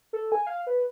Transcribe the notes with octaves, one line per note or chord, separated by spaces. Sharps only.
A4
G#5
F5
B4